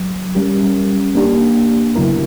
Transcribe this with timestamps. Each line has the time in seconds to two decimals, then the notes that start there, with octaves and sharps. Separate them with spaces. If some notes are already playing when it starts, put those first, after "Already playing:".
Already playing: F#3
0.35 G3 C#4 G4 A#4
1.15 A#3 D4 G4
1.96 C#3 F#3 B3 E4 A#4